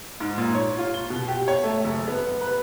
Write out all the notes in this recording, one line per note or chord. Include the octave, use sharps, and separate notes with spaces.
G#2
A#2
C#5
F4
G7
B2
G4
C#5
A3
F#1
B3
B4